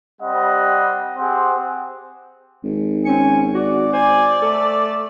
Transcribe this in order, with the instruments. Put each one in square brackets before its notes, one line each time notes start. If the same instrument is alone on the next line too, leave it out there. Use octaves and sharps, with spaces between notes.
[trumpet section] G3 C4 D#5 F#5 B5
C4 G4 G#4 C5 F#5
[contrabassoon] G#1
[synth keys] C4 C#4 C#7 [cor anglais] G#5
[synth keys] F#4 [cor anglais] D5
[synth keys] C5 [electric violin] D5 [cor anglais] G#5
[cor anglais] A3 [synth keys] A4